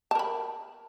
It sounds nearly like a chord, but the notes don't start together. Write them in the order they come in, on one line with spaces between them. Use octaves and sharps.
A5 A#4 B5